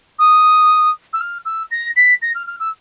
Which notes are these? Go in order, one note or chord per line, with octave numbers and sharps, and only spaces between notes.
D#6
E6
F6
E6
A#6
B6
A#6
F6
F6
E6